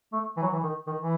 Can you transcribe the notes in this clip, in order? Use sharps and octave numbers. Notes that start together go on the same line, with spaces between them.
A3
E3
F#3
E3
D#3
D#3
E3